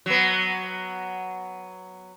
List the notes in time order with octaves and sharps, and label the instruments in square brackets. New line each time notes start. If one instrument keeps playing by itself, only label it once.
[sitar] F#3 B3